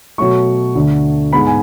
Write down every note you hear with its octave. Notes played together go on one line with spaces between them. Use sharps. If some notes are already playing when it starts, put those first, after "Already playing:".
B2 F#3 A3 C#6
D2 D3 A3
G#2 G#3 B3 B5
G#5